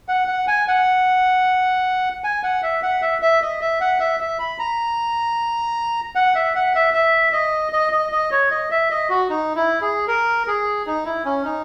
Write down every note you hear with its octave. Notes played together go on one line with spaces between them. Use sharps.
F#5
F#5
G#5
F#5
G#5
F#5
E5
F#5
E5
E5
D#5
E5
F#5
E5
E5
B5
A#5
F#5
E5
F#5
E5
E5
D#5
D#5
D#5
D#5
C#5
D#5
E5
D#5
F#4
D#4
E4
G#4
A#4
G#4
D#4
E4
C#4
D#4